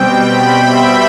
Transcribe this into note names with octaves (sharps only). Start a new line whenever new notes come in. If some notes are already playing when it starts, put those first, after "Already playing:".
Already playing: B2 G3 C4 G5
B5
E5